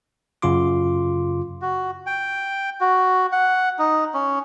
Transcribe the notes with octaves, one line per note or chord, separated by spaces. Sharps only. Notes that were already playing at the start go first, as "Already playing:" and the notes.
F#2 C#3 F4 C6 D6
F#4
G5
F#4
F#5
D#4
C#4